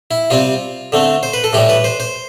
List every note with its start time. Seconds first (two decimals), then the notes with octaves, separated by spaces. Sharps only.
0.11 E4
0.30 C3 G3 C4 F4
0.92 D3 A3 C4
1.23 C5
1.34 B4
1.44 A4
1.53 A2 E3 G3 G4
1.69 B4
1.84 C5
2.00 C5